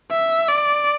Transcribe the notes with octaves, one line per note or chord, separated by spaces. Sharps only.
E5
D5